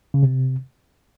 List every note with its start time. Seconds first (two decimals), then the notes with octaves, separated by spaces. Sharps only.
0.14 C#3
0.23 C3